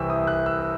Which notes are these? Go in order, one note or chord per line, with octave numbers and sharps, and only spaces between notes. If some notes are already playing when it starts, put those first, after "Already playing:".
Already playing: C2 C3 E3 C4 C#6 E6
D#6
F#6
E6